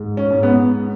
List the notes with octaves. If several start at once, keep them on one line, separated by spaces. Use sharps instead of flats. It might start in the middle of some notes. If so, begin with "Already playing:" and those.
Already playing: G#2
C#4
G#2
B3